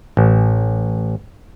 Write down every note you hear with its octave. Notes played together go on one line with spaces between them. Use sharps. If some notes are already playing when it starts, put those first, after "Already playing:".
A1